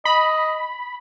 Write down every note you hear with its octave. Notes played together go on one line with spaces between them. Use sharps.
D#5 B5